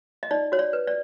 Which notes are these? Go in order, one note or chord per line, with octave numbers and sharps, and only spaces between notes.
D#5
D#4 D5
F#4 C#5
D5
B4
D5